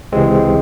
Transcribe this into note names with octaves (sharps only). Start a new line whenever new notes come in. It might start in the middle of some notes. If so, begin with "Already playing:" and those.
C#2 C3 E3 G#3 C4